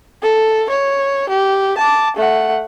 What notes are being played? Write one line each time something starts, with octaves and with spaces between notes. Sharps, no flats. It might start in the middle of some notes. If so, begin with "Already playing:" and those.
A4
C#5
G4
A5 D6
A3 F#5